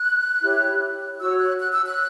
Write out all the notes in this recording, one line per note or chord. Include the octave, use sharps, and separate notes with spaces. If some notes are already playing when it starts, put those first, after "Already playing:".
Already playing: F#6
E4 G4 C#5
F#4 C#5 E6
F#6
F#6
E6
F#6